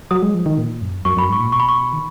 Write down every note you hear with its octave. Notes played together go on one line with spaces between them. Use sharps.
F#3 D#6
G#3
F3
D#3
A#2
F#2
F#2 C#6
F#2 B5
G#2 C#6
A#2
B2 C#6
B5
C#6
D#3